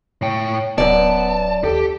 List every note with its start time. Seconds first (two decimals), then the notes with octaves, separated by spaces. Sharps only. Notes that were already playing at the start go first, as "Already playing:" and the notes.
0.22 A2 C#5 G5
0.78 D1 F#2 B3 D5 A5
1.64 D#2 G4 A4